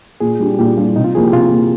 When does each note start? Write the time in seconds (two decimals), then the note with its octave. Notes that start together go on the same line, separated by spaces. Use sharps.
0.20 A#2 G#4
0.39 G3 D4 G4
0.58 A#2 G4
0.77 G3 D4 F4 G4
0.96 C3 D#4
1.04 F4
1.15 F3 A#3 G#4
1.24 G4
1.32 C3 F4
1.52 F3 A#3